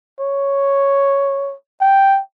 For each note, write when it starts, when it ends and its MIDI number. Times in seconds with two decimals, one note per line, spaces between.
0.20 1.55 73
1.81 2.20 79